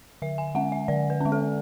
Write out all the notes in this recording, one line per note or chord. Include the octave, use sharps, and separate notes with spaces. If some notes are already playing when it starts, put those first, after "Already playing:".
D3 E5
G#5
G#3 C#4 F#5
E5
D3 D5
B4
G#3 C#4
A4